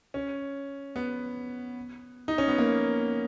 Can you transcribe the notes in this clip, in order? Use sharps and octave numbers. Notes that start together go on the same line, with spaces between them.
C#4
B3
D#4
C#4
B3
A#3